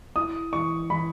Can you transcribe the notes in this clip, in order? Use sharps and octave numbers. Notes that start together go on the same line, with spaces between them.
E4 D#6
E3 C#6
E3 B5